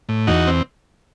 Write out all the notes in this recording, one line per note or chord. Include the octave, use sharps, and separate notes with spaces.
A2
E2 D#4 F#4
C4